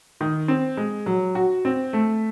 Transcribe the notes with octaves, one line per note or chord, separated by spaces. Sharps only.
D#3
C4
G#3
F#3
F#4
C4
A3